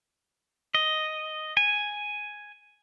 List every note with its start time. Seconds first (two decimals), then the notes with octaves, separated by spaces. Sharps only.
0.75 D#5
1.57 G#5